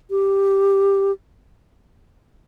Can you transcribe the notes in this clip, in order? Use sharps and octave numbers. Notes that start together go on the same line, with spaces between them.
G4